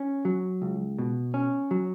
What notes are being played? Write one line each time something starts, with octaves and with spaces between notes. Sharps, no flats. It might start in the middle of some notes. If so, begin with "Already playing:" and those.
Already playing: C#4
F#3
C#2
B2
C#4
F#3